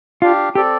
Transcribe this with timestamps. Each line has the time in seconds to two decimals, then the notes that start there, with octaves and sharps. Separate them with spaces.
0.22 D4 F4 G4 F5
0.55 C4 G4 A4 D5